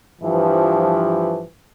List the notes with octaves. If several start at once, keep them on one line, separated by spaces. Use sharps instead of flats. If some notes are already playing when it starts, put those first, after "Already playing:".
G2 E3 F3